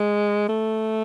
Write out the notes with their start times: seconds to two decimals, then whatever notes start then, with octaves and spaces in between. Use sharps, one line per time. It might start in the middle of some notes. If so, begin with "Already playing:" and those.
Already playing: G#3
0.49 A3